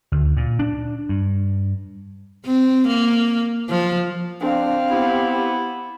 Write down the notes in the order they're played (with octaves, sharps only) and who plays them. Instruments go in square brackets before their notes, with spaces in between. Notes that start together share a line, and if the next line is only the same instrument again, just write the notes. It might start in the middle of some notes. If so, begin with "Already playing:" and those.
[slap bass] D2
A#2
D4
G2
[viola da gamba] C4
A#3
F3
[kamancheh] C4 F5 [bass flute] D4
[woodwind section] B3 E4 [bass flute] G4